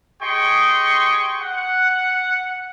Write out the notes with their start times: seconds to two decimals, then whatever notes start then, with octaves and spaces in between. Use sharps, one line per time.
0.21 G4 G#4 D#5 G5 C6 C#6
1.41 F#5